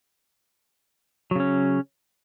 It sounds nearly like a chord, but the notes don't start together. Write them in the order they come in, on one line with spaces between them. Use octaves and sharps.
F#3 C#3 C#4